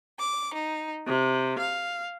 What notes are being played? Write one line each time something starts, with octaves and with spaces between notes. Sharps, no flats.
D6
D#4
C3
F5